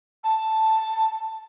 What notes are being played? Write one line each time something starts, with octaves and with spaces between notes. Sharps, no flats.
A5